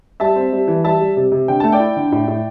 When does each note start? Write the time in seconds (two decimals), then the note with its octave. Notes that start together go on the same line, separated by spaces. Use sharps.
0.20 G3 E5 A5
0.36 C4
0.52 G3
0.68 E3
0.84 G3 E5 A5
1.00 G3
1.17 C3
1.32 C3
1.48 D3 G5
1.60 A3 A5
1.72 D5 G5
1.80 E4
1.96 D3
2.12 A2
2.28 A2